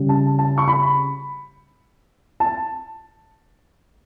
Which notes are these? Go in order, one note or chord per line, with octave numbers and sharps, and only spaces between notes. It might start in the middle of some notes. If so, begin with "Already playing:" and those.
Already playing: C#3 G3
A5
A5
C#6
B5
A5